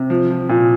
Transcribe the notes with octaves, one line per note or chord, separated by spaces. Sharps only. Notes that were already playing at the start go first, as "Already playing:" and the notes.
Already playing: C3
F3
F3
A#2